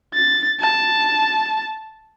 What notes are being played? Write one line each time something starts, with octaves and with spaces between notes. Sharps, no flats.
A6
A5